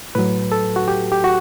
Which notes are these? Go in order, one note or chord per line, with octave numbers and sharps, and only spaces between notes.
A2 F#3 B4
A4
F#4
G4
G4
F#4